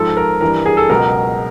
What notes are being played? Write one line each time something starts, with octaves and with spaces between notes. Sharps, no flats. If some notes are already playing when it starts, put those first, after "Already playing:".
Already playing: G#2 F3 A4
A#4
G2 E3 A#4
G#4
A4
C#2 B2 F#3 A#4